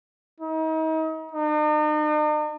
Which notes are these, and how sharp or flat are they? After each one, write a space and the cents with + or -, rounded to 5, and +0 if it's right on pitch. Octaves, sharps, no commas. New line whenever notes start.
D#4 +35
D#4 -45